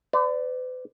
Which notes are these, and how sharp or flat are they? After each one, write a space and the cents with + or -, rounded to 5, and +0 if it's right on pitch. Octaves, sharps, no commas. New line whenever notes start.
B4 +45 D5 +0